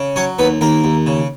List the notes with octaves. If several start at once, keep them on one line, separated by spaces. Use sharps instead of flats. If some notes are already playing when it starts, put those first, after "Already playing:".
Already playing: C#3
F#3 C#4 C#5
D#2 B3 B4
D#2 A#3 A#4
D#2
C#3